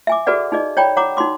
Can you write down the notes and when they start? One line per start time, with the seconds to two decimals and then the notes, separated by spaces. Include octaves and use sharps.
0.07 E5 G#5 D6
0.27 F#4 G#4 A4 B4 D5 F#5
0.52 D#4 G#4 D5 D#5
0.77 C#5 D5 G5 A#5 B5
0.97 C#5 F#5 A#5 D6
1.17 D#4 F#4 C6 D6